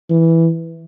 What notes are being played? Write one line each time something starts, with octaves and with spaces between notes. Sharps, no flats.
E3